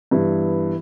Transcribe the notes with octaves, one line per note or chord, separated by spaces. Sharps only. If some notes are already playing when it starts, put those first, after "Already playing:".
G2 E3 B3 E4